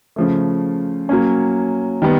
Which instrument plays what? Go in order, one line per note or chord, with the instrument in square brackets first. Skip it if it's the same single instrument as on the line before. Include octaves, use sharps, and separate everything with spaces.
[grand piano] C#3 F3 A3
F#3 A#3 C#4
D#3 G3 B3